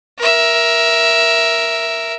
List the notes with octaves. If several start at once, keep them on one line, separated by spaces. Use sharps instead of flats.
A#4 E5